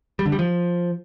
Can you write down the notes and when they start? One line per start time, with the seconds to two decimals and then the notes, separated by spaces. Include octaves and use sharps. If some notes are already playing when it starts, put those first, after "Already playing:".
0.19 G3
0.26 D3
0.32 G3
0.39 F3